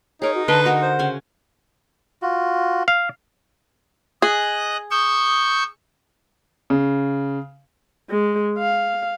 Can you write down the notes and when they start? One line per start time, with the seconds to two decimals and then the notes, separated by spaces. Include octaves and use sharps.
0.22 D#4 G#4 A#4 C#5
0.35 F#4
0.48 D3 B4 D#5 A5 C6
0.66 F#4 A#4 E5 F#5
0.82 C5
0.99 C#3 C#4 G#5
2.22 F4 F#4
2.88 F5
4.22 G#4 D#5 F#6
4.91 C#6 D#6 E6 G6
6.70 C#3
8.10 G#3
8.59 F5